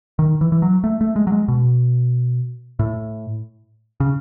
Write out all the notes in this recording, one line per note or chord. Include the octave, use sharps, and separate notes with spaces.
D#3
E3
E3
F#3
A3
A3
G#3
F#3
G#3
B2
A2
C#3